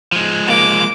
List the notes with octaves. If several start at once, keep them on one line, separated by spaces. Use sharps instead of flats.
F3 G#3
A#3 D6